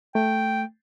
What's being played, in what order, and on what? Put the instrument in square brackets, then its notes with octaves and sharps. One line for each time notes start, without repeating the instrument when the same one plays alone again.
[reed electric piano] A3 [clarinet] G5